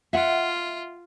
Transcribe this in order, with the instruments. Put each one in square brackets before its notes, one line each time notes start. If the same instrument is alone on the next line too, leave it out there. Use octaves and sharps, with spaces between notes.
[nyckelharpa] F4 [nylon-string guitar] E5 F#5